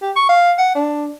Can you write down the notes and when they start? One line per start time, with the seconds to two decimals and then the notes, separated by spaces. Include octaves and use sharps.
0.02 G4
0.16 C#6
0.29 F5
0.58 F#5
0.75 D4